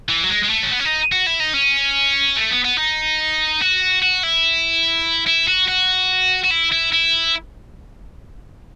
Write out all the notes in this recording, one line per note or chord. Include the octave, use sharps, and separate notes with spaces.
E3
F#3
G#3
G#3
A3
C#4
B3
C#4
D#4
F#4
E4
D#4
C#4
A3
B3
B3
D#4
F#4
F#4
E4
E4
F#4
F#4
F#4
E4
E4
E4